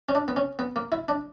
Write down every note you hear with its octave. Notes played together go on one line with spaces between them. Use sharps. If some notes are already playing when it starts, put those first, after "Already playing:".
C#4
D4
B3
C#4
B3
A#3
E4
D4